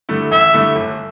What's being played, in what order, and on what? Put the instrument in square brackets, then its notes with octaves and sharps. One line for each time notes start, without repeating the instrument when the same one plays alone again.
[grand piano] G2 D3 A3 E4
[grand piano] A1 [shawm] E5
[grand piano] G2 D3 A3 E4
G1